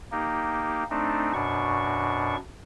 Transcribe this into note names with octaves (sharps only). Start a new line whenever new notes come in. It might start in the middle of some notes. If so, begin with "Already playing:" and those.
A#3 D#4 G4
A3 C4 D4 D#4
F#2 B2 D4 C#6